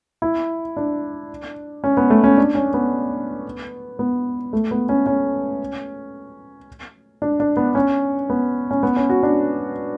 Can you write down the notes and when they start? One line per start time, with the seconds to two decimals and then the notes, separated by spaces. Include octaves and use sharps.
0.22 E4
0.77 D4
1.84 C#4
1.97 B3
2.10 A3
2.24 C#4
2.38 D4
2.55 C#4
2.74 B3
3.99 B3
4.53 A3
4.71 B3
4.89 C#4
5.06 C#4
7.22 D4
7.40 D4
7.57 B3
7.75 C#4
8.30 B3
8.71 C#4
8.83 B3
8.96 C#4
9.10 F#4
9.23 D4